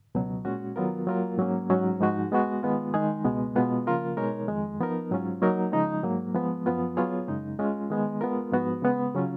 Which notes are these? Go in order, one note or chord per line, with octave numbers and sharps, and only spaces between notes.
C#2 B2 F#3
A#2 G#3 C#4 F#4
D#3 F#3 B3 F4 A#4
F#3 A#3 F4 A#4
G#2 F#3 A#3 C#4
G#2 F#3 C#4 F#4
G#2 F3 G#3 D#4 F#4
G#3 B3 F#4
D#3 G#3 B3 F4
D#3 G#3 D#4 G#4
C#2 B2 G#3 B3
B2 G#3 B3 F4 G#4
C#3 F3 A#3 F4 A#4
B2 G#3 D#4 A#4 C#5
F2 D#3 G#3
F3 B3 D#4 A#4
G#2 F#3 C#4 F4
F#3 A#3 D#4 A#4
C#3 F3 G#3 D#4
G#2 F#3 A#3
F3 G#3 B3
F#2 F3 B3 F4
F#3 B3 F4 G#4 C#5
F#2 C#3 G#3 D#4
G#3 C#4 F4
D#3 G#3 B3
G#3 B3 F4 A#4
G#2 F3 B3 F#4
C#3 G#3 B3
C#3 F#3 C#4 F4